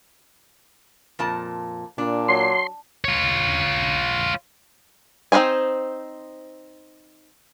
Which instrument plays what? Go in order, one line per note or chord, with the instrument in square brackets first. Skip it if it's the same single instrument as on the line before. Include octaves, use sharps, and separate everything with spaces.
[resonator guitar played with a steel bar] F2 A#2 A5
[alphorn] A#2 [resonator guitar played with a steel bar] D4
[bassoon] F#3 [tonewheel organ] C6
[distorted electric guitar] F4 C#5
[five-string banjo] C4 D#4 F4 C5 G#5